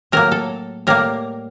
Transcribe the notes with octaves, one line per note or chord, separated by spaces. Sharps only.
A2 F#3 A#3 A#4
A4
A2 G3 A#3 A#4